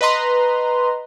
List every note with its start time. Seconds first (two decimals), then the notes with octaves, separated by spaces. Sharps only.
0.01 B4 D#5 A#5 C6